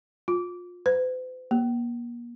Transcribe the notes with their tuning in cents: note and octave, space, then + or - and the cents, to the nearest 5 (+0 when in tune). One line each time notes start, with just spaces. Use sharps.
F4 +25
C5 -45
A#3 +35